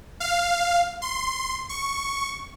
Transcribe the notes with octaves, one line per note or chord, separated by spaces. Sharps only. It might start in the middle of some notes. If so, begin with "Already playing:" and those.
F5
C6
C#6